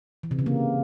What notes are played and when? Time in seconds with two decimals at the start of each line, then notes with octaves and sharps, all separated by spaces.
0.23 E3
0.31 C3
0.39 C#3
0.46 A#3